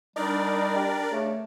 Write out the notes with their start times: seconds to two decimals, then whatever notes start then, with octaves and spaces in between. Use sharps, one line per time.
0.16 G3 D4 D#4 A#4 D5
0.76 G4
1.12 C#3 A3